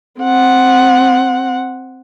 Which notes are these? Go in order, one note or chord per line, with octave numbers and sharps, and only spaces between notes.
C4 F#5